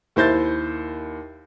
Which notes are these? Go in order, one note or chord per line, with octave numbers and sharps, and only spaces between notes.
D#2 E4 C5 G6 A6